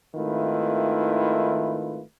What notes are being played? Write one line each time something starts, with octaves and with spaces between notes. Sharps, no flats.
G#1 D#3 A3 E4 F4 B4